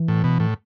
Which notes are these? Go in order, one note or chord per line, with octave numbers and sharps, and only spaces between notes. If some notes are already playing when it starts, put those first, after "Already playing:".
Already playing: E3
A2
B2
A2